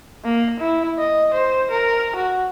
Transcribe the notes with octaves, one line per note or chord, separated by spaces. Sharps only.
A#3
E4
D#5
C5
A#4
F#4